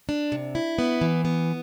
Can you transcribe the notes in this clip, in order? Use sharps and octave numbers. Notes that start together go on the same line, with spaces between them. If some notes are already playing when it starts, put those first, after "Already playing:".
D4
C3
E4
B3
E3
B3